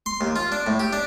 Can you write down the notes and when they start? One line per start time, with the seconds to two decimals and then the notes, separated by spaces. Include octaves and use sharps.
0.06 C6
0.21 D#2
0.36 F4
0.52 D4
0.67 A2
0.80 G4
0.93 D4